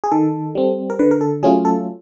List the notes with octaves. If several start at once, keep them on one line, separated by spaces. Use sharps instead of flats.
G#4
D#3 A4
G3 C4
A#4
D3 B4
A#4
A4
F#3 A3 C#4 F4 G#4
A4